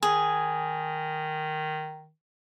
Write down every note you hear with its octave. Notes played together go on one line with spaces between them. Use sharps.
D#3 G#4